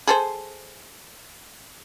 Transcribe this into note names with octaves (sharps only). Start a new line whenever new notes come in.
G#4 A4 C5